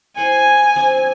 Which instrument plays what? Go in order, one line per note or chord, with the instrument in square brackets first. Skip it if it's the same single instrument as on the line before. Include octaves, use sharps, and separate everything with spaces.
[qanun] E4 C5 F#5 [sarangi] G#5
[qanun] F3 C4 D4